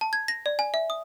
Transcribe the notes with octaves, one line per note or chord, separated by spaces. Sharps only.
A5
G#6
A#6
D5
G#5
E5
D#6